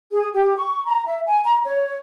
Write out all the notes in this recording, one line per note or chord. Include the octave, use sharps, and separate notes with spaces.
G#4
G4
C#6
A#5
E5
G#5
A#5
C#5